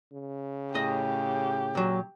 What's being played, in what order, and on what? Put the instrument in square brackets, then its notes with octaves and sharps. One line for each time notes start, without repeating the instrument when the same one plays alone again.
[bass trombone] C#3
[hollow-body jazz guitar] A2 G#4 D#5 [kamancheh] G4
[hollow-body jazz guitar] A#2 F#3